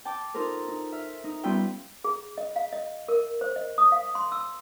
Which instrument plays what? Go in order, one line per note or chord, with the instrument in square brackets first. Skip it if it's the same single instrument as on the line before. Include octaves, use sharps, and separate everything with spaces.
[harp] G5 A5 D6
D#4 F4 A4 A#4 C5
D#4
E5 F6
D#4
G3 B3 C#4 F4 E5 G5
[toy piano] G#4
D#5
F5
D#5
A#4
C5
D#5
D#6
F5
C6
E6